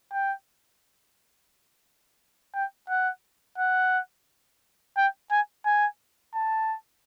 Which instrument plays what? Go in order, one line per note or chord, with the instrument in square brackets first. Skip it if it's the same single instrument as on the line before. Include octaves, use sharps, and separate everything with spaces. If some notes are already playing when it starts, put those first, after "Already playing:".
[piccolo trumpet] G5
G5
F#5
F#5
G5
G#5
G#5
A5